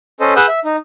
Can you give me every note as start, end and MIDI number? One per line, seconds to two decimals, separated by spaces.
0.20 0.34 61
0.20 0.34 69
0.20 0.34 72
0.20 0.34 75
0.36 0.46 68
0.36 0.46 71
0.36 0.46 78
0.36 0.46 87
0.36 0.46 88
0.36 0.46 91
0.48 0.60 76
0.64 0.76 63